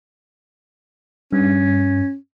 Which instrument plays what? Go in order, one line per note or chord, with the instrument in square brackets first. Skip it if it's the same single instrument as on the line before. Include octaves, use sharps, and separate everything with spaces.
[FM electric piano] G2 [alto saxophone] C#4